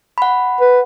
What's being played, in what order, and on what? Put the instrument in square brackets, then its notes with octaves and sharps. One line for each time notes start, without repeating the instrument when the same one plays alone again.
[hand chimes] F#5 B5
[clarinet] B4